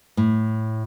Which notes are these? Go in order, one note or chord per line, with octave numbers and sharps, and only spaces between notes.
A2